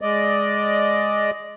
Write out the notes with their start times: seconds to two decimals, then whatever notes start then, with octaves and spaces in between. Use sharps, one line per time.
0.01 G#3 D5 D#5